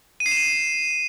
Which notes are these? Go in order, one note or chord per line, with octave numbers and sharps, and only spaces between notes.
D#7
C7
E7
D#7